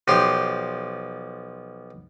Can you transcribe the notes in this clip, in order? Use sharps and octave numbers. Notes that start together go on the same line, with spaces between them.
B1 F3 G4 C6